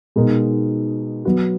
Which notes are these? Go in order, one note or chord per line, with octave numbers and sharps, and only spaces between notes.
B2 G#3 D#4 A#4
F#3 B3 F#4